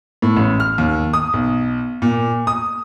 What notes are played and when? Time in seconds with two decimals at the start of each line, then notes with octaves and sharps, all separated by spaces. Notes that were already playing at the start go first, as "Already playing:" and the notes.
0.22 A2
0.36 A1
0.60 F6
0.78 D#2
1.13 D#6
1.33 B1
2.02 A#2
2.47 D#6